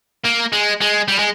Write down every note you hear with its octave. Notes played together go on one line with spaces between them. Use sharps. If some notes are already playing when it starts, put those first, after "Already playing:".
A#3
G#3
G#3
G3
G#3